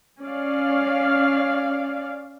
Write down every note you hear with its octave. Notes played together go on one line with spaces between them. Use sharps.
C#4 D5 F5